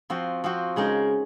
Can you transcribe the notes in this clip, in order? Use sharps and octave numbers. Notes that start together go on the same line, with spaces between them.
F3 C4 F#4
F3 C4 F#4
C#3 G#3 D#4 A#4